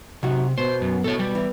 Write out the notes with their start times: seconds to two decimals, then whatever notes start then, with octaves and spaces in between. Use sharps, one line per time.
0.23 F#2 C3 D#4 F#4
0.58 B2 C5
0.81 F#2
1.04 B2 A4 C#5
1.19 G3
1.35 E3